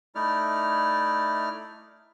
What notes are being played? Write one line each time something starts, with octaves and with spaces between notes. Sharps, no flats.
A3 D#4 E4 D5 F6